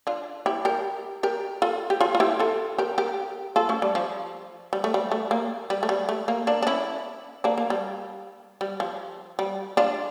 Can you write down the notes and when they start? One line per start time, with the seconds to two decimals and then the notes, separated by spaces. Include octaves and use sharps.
0.07 D4 F4
0.46 E4 G4
0.65 G4 A#4
1.23 G4 A#4
1.62 F4 A4
1.90 G4
2.01 F4 A4
2.15 F4
2.20 E4 G4
2.39 F4 A4
2.78 G4 A#4
2.98 G4 A#4
3.56 F4 A4
3.69 A3 C#4
3.82 G3
3.95 F3
4.73 G3
4.84 A3
4.94 G3
5.11 A3
5.31 A#3
5.70 G3
5.83 A3
5.89 G3
6.09 A3
6.28 A#3
6.47 A#3 D4
6.62 D4
6.67 C#4 E4
7.44 A#3 D4
7.58 A#3
7.70 G3
8.61 G3
8.80 F3
9.39 G3
9.77 D4 F4